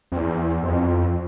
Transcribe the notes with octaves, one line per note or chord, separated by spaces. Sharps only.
F2
E2
F2